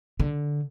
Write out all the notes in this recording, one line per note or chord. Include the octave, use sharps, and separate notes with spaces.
D3